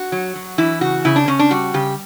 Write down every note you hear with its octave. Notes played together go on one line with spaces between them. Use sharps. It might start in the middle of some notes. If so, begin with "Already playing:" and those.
Already playing: F#4
F#3
F#3
E3 E4
C#3 F#4
C#3 E4
D4
C#3 C#4
D4
G3 F#4
C#3 G4